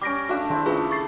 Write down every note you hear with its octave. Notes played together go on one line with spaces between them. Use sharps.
G3 C#4 D6 A#6 D7
A3 D4 F#4 G4 F5
D#3 C4 E4
C#3 A3 F4 G#4 B4
C#6 A6 C7